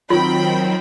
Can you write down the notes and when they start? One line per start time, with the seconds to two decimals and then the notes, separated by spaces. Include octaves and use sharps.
0.10 D#3 F#3 C4 F4 G5 B5